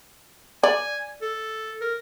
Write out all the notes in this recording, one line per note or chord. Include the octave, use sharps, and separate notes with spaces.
D5 G#5
A4
A#4